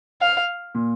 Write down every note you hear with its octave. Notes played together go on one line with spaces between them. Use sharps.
F5
A#2